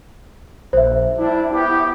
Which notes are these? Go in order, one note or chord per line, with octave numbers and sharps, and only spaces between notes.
A#1 C5 E5
G3 D4 E4
B3 E4 G4